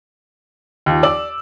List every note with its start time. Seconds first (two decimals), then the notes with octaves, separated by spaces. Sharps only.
0.86 D#2 D#4 F4
1.03 D5 D6 E6 F#7